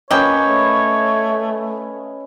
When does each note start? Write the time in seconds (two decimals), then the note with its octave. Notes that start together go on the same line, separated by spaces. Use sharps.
0.11 A#3 C#4 B4 C#5 D#5 G5
0.47 A3